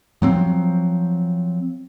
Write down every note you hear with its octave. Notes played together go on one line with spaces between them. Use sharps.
F3 F#3 C4